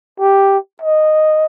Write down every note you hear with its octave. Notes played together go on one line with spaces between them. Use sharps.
G4
D#5